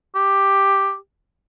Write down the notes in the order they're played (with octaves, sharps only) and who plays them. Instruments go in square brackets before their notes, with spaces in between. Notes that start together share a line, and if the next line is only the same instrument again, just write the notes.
[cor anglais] G4